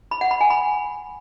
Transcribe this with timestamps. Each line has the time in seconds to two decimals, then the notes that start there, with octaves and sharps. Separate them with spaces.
0.11 B5
0.21 F#5
0.31 B5
0.41 G#5
0.50 B5